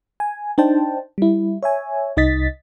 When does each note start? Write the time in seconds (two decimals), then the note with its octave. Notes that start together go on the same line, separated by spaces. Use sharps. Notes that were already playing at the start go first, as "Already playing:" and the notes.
0.20 G#5
0.58 D4 D#4 C5 G5 A5
1.18 G3 E4
1.63 C#5 E5 G#5
2.17 C2 D#4 D#5 A6 B6